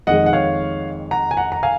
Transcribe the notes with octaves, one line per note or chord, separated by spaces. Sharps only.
F2 D#3 G#3 D#5 F#5
F#5
C#5 F5
F#5 A#5
G#5
F#5 A#5
A#5
F5 G#5